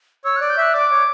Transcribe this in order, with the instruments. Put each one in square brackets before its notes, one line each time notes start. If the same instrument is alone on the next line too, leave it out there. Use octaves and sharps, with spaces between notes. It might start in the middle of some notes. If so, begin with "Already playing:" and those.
[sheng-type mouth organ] C#5 [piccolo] E6
[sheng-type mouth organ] D5 [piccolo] F#6
[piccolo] G6
[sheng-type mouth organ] E5 [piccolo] F#6
[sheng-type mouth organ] D5 [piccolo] D6
[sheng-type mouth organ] C#5